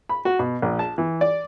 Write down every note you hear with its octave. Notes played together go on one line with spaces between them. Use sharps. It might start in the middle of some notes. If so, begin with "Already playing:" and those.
B5
F#4
B2
A#1
A5
E3
D5